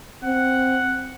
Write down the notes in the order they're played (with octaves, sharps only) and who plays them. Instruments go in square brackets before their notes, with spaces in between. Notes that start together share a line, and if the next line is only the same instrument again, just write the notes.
[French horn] C4 [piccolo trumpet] F#5